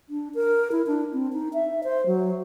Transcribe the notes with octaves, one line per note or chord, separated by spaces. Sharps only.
D4
A#4
E4
D4
C4
D#4
E5
C5
F#3